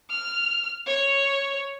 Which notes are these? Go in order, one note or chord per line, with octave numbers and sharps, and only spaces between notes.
F6
C#5